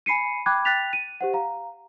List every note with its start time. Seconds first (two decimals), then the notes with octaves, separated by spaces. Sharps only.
0.06 G#5 B5 C7 C#7 D#7
0.46 G5 B5 D6 F#6 G#6
0.65 G5 F#6 A6 B6 F7
0.93 D#7
1.21 G4 C5 F#5
1.33 F5 A#5